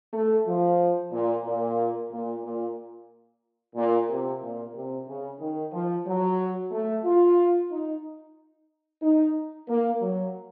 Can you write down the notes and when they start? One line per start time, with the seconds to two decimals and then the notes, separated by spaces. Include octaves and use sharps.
0.13 A3
0.47 F3
1.12 A#2
1.44 A#2
2.11 A#2
2.43 A#2
3.75 A#2
4.09 C3
4.42 A#2
4.74 C3
5.08 C#3
5.40 D#3
5.73 F3
6.06 F#3
6.71 A3
7.04 F4
7.71 D#4
9.02 D#4
9.68 A#3
10.01 F#3